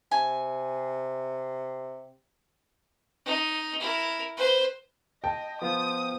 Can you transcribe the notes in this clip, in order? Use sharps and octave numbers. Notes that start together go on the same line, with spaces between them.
C3 G#5
D#4
E4 A#4
B4 C5
D#5 G5 A5
F3 B3 F4 C5 D#6